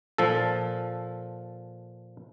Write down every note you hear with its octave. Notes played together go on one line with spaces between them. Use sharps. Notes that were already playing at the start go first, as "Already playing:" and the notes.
A#2 F3 A4